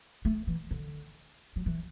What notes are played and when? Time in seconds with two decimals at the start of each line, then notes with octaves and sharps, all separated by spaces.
0.25 A3
0.47 E3
0.71 D3
1.56 F#3
1.66 E3